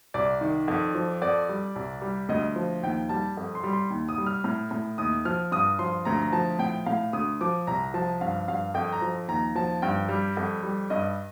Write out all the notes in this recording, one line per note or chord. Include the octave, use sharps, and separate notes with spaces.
C2 D5
D#3
F2
F3
F2 D5
G3
C2
G3
D2 D#5
F3
D#2 G5
G3 A5
F2
C6
G3
C6
D#2
D#6
G3
F6
A2 F6
A2
D#2 D#6
F3 F6
G2 D#6
F3 C6
D2 A#5
A#5
F3 A5
A2 G5
A2 F5
D2 D#6
F3 D6
C2 A#5
F3 A5
G2 F5
G2 F5
F2 G5
A#5
F3
D#2 A#5
F3 A5
G2 G5
G3
F2
G3
G2 D#5